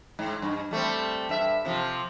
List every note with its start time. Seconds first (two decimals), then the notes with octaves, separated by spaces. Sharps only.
0.19 G#2
0.42 G2
0.71 G3 A3 C4
1.29 G2 E5
1.65 C3 F3